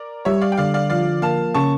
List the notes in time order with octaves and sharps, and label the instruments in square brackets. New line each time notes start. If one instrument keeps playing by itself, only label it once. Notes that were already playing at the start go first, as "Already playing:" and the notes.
Already playing: [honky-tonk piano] A#4 D5
[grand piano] G3 [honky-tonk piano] C#5 E5
[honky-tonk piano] D5 F5
G5
[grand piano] D3 [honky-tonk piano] D5 F5
[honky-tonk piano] D5 F5
[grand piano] F3 [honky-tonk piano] D5 F5
[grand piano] A#3 [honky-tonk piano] F5 A5
[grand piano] C#3 [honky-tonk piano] A5 C#6